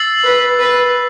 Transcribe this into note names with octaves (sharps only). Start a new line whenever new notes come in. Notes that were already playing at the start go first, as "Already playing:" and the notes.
Already playing: E6 A6 C7 F#7
B4
B4